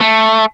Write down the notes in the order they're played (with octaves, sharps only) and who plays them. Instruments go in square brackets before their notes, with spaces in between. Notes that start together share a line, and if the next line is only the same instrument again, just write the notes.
[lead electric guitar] A3